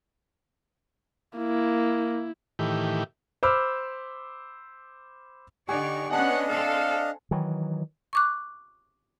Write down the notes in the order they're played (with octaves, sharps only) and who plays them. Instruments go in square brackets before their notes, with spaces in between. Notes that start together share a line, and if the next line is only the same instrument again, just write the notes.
[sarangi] A#3 [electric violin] E4
[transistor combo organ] A2 D#3 E3 G4
[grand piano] C5 B5 D6 E6 F6
[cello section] D3 D#4 D5 [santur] G4 F#5 G#5 [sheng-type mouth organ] C#6
[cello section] B3 C#4 [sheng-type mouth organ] D4 D#5 [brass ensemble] F#5 [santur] G#5 A5
[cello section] C4 A4 [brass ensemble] F5
[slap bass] D#3 E3 F#3
[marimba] C#6 D6 F#6